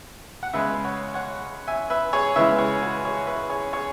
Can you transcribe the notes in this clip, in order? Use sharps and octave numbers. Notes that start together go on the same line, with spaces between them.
F#5
C#3 G#3 B3 B4 E5
C#5 F#5
C#5 F#5
E5 G#5
B4 E5
G#4 C#5
C#3 E3 G#3 B3 B4 E5
G#4 C#5
F#4 B4
G#4 C#5
B4 E5
G#4 C#5
G#4 C#5